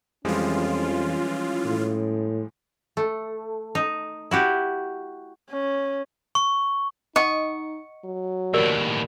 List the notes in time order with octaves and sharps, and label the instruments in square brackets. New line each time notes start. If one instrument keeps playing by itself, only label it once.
[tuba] F2 [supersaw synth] E3 F4 [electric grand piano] F3 G3 G#3 [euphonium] C#4
[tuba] A2
[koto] A3
D#4
E4 F#4 G4
[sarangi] C#4
[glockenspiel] C#6
[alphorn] D#4 [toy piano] D#5 F#5 [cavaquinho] C#6 D#6
[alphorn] F#3
[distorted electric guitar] D#2 A2 [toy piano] G4 A#4 D5